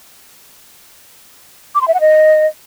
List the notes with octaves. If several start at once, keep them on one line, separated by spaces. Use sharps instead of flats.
D6
C6
E5
F#5
D#5